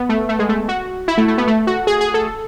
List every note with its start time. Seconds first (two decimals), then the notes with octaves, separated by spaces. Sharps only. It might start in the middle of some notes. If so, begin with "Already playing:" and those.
Already playing: B3
0.09 A3
0.29 A3
0.39 G#3
0.49 A3
0.69 F#4
1.08 E4
1.18 A3
1.28 A3
1.38 B3
1.47 A3
1.67 F#4
1.87 G#4
2.01 G#4
2.14 A4